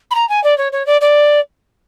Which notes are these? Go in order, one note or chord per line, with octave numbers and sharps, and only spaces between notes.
B5
A#5
G#5
D5
C#5
C#5
D5
D5